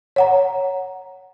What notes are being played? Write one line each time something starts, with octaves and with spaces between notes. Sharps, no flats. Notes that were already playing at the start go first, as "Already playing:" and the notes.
C#5 F#5 A#5